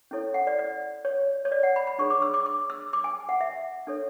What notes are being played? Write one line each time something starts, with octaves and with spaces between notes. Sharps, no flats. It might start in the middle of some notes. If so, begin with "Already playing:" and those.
C#4 E4 A4 C#5
F#5
D5
D5
C#5
C#5
D5
F#5
B5
B5
D4 G#4 C#5 C#6
D6
E6
D6
D6
E6
D6
G#5
F#5
E5
D4 A4 C#5